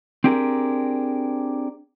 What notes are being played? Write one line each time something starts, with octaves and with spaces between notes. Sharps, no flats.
C4 D4 G4 G#4 A#4